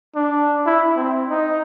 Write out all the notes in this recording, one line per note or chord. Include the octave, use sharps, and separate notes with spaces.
D4
E4
C4
D#4